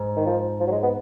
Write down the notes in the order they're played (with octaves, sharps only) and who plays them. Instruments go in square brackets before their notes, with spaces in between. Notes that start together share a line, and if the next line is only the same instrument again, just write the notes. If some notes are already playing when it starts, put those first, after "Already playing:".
Already playing: [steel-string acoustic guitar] G#2
[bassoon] D#3
F3
F3
F#3
G#3
B3